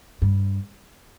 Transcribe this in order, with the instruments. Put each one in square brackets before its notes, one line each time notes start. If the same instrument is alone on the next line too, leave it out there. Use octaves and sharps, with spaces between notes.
[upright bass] G2